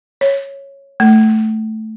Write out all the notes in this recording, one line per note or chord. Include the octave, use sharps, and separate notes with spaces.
C#5
A3